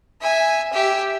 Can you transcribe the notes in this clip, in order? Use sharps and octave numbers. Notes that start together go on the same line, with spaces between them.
E5 G#5
G4 E5